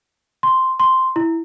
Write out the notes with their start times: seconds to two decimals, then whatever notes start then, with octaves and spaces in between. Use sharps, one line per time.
0.43 C6
0.80 C6
1.16 E4